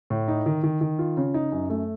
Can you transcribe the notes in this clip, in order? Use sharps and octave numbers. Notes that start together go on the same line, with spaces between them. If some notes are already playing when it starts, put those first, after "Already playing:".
A2
D#4
D#3
D#3
D#3
F4
C#3
D#4
F#2
A3